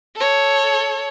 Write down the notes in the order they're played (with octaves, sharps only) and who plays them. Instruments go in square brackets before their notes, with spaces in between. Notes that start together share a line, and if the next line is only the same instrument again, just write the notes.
[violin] A4 C#5